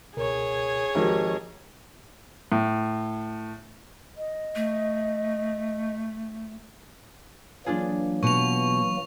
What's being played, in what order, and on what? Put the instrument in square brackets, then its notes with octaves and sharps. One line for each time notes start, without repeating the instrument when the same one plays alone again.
[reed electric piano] C#2 B2 A#4 [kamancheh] G#4 C#5
[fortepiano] G#1 D#3 G4 [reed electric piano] F3 C5
[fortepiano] A2
[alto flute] D#5
[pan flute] A3
[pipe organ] E3 F#3 A#3 [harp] D4 F4 G#4
[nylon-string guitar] B2 B3 [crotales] C#6 F7